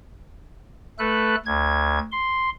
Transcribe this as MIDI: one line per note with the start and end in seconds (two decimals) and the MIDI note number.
0.99 1.35 57
0.99 1.35 69
0.99 1.35 71
0.99 1.35 90
1.46 1.99 38
1.46 1.99 92
2.12 2.50 84